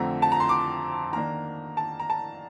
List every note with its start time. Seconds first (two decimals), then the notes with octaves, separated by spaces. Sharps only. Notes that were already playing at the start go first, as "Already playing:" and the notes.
Already playing: F2 D3 F3 A3 C4 A#5
0.22 A5
0.32 A#5
0.40 C6
0.49 D6
1.13 D#3 A#3 D4 A#5
1.77 A5
2.00 A#5
2.10 A5